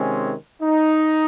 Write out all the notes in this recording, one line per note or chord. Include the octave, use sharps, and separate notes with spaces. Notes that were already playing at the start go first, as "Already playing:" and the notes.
Already playing: C3 D#3 G#3 C4 C#4
D#4